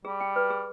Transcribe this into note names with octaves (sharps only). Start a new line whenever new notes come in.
G3 G#4
G5
B4
G#4